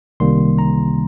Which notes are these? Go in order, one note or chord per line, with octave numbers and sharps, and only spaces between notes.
C2 C3 D#3 G3 A#3 C6
A#5